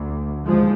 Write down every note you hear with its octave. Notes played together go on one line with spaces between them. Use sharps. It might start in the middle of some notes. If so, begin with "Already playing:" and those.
Already playing: D2
D#2 F3 G#3